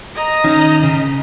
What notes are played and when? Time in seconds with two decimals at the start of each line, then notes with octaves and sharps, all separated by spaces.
0.15 D#5 A#5
0.44 D#3 C#4 D#4
0.84 C#3